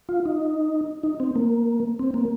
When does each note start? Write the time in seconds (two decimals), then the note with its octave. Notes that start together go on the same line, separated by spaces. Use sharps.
0.09 F4
0.26 D#4
1.03 D#4
1.20 C4
1.36 A#3
1.99 C4
2.14 A#3